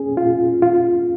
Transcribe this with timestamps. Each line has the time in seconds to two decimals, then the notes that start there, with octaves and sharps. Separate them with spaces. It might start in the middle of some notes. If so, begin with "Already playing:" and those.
Already playing: C#4 G#4
0.17 F4
0.62 F4